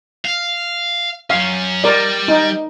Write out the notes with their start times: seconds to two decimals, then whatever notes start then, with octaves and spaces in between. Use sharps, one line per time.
0.25 F5
1.30 F#2 C#4 F5
1.84 G3 A#4 D5
2.28 D#4